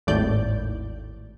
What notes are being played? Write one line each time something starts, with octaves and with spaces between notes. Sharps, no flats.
G#1 D#2 A2 D5 G6